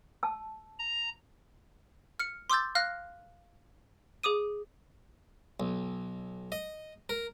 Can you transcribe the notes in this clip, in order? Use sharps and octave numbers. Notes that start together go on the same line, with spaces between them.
A5 E6
A#5
F6 C#7
C6 D6 E6 G6 A6
F5 F6 F#6 A#6
G#4 D6 D#6 D#7
B1
D#5
A#4